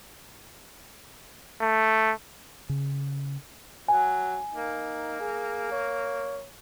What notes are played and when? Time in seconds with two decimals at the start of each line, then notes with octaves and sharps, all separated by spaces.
1.61 A3
2.69 C#3
3.88 F#3 G#5
4.54 A#3 D#4
5.20 G#4
5.72 C#5